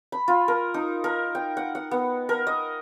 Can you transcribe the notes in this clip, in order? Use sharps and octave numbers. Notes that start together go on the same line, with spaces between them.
B5
F4
A#4
D#4
A#4
G5
F#5
F#5
B3
A#4
D#5